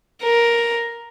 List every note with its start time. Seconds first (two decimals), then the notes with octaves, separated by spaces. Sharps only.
0.23 A#4